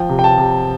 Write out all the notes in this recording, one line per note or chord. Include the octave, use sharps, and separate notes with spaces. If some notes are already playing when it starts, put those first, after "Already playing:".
Already playing: F3 G5
C3
G5
A5
C3